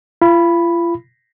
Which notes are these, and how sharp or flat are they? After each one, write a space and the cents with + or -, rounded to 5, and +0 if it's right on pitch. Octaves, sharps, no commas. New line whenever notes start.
F4 -40 B5 +0